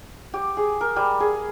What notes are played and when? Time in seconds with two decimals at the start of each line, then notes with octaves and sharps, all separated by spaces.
0.34 G4
0.57 G#4
0.81 A#4
0.96 G3
1.20 G#4